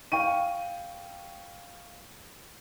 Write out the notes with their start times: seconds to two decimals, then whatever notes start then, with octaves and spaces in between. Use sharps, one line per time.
0.12 F5 G5 C#6 D#7